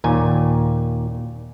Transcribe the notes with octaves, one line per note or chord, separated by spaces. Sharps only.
D#2 A#2 G#5